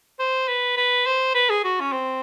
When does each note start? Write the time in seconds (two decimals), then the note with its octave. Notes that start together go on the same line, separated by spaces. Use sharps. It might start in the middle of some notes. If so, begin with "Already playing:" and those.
0.19 C5
0.48 B4
0.77 B4
1.06 C5
1.34 B4
1.50 G#4
1.64 F#4
1.80 C#4
1.92 C4